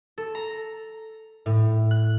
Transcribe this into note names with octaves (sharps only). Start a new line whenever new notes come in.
A4
A#5
A2
F#6